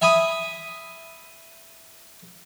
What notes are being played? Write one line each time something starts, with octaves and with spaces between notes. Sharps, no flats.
E5 G#5 B5 D#6